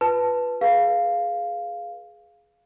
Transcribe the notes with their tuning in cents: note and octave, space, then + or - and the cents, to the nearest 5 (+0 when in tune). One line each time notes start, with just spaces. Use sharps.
F4 +15 B4 +0 A5 +0
G#4 +5 B4 -25 F5 +0